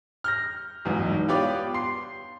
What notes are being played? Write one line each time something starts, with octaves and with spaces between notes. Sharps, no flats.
F6 G6 A#6
B1 E2 G#2
B3 F4 G4 B4 C#5 D5
C6 C7